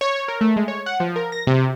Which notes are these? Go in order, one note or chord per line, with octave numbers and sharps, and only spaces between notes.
C#5
C#5
A#4
A3
G#3
C#5
F#5
F3
A#4
A#6
C3